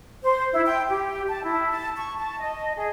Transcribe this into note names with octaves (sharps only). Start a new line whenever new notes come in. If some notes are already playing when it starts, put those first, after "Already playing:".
C5
E4
G5
G4
A5
E4
A5
C#6
A5
D#5
G#4